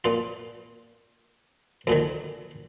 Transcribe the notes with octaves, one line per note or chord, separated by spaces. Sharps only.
A#2 F4
D2 A#2 D#3